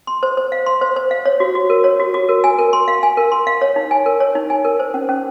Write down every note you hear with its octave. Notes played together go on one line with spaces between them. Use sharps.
C6
C5
C5
F5
C6
C5
C5
F5
C#5
F#4
F#4
A#4
C#5
F#4
F#4
A#4
G#5
A#4
C6
F5
G#5
A#4
C6
F5
C#5
D#4
G#5
A#4
C#5
D#4
G#5
A#4
C5
C#4
C#4